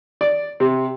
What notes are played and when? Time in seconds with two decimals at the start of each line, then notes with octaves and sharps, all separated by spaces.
0.21 D5
0.60 C3